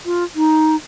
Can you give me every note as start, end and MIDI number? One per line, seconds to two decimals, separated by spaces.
0.06 0.24 65
0.36 0.76 63